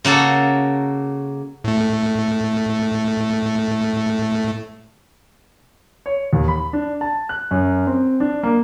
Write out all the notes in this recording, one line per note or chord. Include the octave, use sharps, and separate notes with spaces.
C#3 A#3 F#4 A4
A2 A3
C#5
D#2
B5
D4
A5
F#6
F#2
C4
D4
A#3